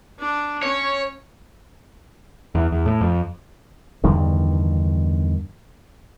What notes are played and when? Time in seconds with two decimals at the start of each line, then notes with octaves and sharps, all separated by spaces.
0.20 D4
0.62 C#4 C#5
2.55 E2
2.72 E2
2.86 A2
3.01 F2
4.04 E2 G2 D3 D#3